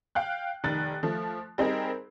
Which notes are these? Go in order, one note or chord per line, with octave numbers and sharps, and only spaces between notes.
F5 G5 F#6
F1 D#3 F#6 A6
F3 A3
G3 C4 D#4 G#4 A#4